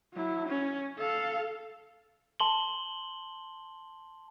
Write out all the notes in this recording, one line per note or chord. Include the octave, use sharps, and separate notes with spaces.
F#3 E4
C#4
A4 F5
A5 C6 F#7 G7